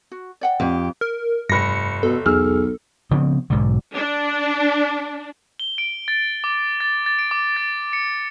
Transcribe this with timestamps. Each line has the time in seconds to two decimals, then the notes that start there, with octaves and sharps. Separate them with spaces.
0.12 F#4
0.41 D5 F#5 G5
0.60 F2 G4
1.01 A#4
1.49 F1 G2 B5 A#6 C#7
2.03 B2 A4
2.26 B1 E2 G#4 E6 F6
3.11 C#3 F3 B3 C4
3.50 B1 G#2 D3
3.96 D4
5.59 G7
5.78 D7
6.08 A6
6.44 D6
6.81 A6
7.06 A6
7.19 D7
7.31 D6
7.57 A6
7.93 C#7